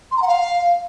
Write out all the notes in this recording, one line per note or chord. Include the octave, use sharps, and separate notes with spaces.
C6
A#5
F#5
F5